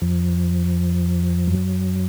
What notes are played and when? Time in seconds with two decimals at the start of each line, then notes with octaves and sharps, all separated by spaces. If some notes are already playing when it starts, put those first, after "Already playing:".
0.02 F2 F3
1.47 F#2 F#3